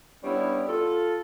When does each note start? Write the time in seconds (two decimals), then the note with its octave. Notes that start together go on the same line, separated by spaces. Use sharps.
0.23 G3 B3 C#4 D4 E4
0.68 F4 A4